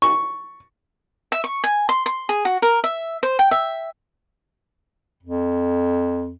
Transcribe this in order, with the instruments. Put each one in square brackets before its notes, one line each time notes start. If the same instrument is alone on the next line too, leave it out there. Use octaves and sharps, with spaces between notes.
[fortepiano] C#6
[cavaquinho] E5
C#6
G#5
C6
C6
G#4
F#4
A#4
E5
C5
G5
E5
[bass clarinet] F2